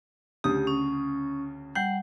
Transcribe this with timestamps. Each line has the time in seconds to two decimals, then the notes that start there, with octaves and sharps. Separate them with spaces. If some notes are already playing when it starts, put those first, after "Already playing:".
0.44 D2 C#3 G4 D#6
0.67 C#4
1.75 G3 F#5 G6